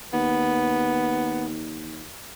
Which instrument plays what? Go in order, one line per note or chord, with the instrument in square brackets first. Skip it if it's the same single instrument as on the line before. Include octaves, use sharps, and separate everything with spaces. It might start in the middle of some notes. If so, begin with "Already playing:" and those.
[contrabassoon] D#2 [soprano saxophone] B3